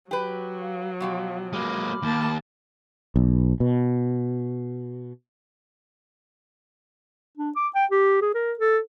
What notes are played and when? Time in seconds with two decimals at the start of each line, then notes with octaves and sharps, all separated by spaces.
0.11 F#3 G4 B4
0.61 F5
1.00 B2 F3 G4 F5
1.53 G#3 A#3 B5 D6 F6
2.02 D#2 A#3 A5
3.16 B1
3.60 B2
7.37 D4
7.56 D6
7.75 G5
7.91 G4
8.22 G#4
8.34 A#4
8.59 A4